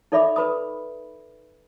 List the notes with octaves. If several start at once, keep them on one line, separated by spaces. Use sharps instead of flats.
D#4 A4 D5 E5 B5 D6
A4 B4 B5 D#6